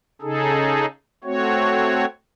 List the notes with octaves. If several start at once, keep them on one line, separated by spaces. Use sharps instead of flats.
C#3 D#4 G#4 A4
A3 C4 F#4 C#5